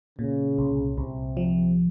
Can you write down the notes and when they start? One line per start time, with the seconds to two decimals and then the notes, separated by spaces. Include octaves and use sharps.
0.18 A#2 C#3
0.58 C2
0.98 C2 C3
1.37 F3